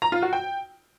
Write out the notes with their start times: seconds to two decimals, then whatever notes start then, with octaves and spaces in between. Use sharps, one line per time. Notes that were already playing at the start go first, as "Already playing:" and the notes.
0.02 A#5
0.12 F4
0.22 F#4
0.33 G5